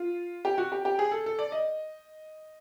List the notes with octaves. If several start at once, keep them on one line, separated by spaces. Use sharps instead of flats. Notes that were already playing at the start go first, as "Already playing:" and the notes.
Already playing: F4
G4
F#4
G4
G4
G#4
A4
A4
D5
D#5